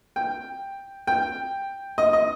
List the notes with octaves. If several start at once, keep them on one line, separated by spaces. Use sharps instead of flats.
G5
G5
D#5
D#5